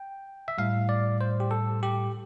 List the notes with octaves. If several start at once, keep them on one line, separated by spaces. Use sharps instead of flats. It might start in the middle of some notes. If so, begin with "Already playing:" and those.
Already playing: G5
E5
A2 G3 F5
D5
C5
G4
A4
G4